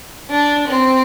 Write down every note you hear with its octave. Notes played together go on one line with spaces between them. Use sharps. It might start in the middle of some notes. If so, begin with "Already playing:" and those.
D4
C4